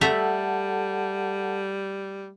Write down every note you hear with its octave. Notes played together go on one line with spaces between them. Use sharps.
G3 A3 A4 E5 F#5 A5 A#5